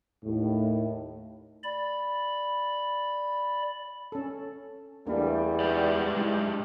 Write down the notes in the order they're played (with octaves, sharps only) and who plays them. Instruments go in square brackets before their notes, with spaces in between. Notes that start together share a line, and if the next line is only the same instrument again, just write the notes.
[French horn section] D#2 A2
[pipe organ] D5 B5
[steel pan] C#4 A4
[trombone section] E2 G3 [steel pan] A3 A#3 D4
[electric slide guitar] G#2 G4 D5
[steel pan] G#3 E4